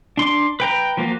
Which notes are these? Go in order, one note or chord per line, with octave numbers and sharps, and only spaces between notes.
D4 C6 D6
B4 G5 A#5
F3 A#3 F4 F#4